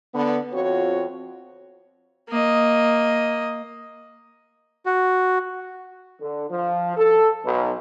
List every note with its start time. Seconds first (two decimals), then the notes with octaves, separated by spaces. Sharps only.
0.14 D3 B3
0.53 F2 C4 F4 F#4 C#5
2.29 A#3 D#5
4.86 F#4
6.20 D3
6.49 F3
6.95 A4
7.43 B1